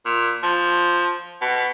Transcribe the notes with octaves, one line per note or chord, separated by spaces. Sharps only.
A#2
F3
B2